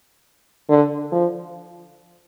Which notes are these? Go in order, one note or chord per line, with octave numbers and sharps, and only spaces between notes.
D3
F3